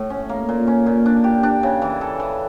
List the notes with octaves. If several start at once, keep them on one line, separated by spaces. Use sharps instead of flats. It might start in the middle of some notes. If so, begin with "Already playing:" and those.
Already playing: A2 A3
C#4
A#3
A#2
C#4
A#2
D4
G4
D4
C#3
E3
A4
E3